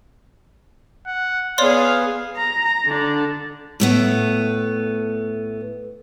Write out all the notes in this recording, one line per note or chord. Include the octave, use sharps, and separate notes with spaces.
F#5
B3 G#4 C#5 D5 F5 C6
A#5
D3 D4
A2 A3 B3